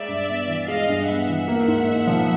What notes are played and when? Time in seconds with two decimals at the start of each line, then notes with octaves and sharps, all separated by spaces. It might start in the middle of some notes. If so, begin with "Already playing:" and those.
Already playing: G#3 D5 E5
0.08 G2
0.28 B3
0.47 E3
0.68 G#3 D#5 F5
0.88 G2
1.07 B3 E5 F#5
1.28 E3
1.48 A#3
1.68 G#2
1.87 D#4
2.07 F3